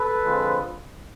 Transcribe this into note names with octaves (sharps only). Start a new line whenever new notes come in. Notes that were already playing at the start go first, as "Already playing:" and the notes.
Already playing: A4 B4
D3 F3 G#3 C4